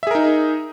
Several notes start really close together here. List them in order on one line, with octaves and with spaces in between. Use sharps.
E5 G#4 A#4 D#4